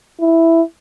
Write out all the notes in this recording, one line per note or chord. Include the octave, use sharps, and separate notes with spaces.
E4